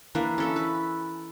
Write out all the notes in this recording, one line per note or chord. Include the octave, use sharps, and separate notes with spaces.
E3 A#3 D4 B4
C#4 A4 E5
B4